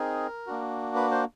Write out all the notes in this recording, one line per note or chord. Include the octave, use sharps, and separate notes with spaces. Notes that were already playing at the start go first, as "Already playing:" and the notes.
Already playing: C4 D#4 G#4 A#4
A#3 D4 F#4
B4
C5